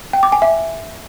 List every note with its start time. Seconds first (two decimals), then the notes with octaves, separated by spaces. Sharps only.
0.13 G5
0.23 D6
0.32 G#5
0.42 E5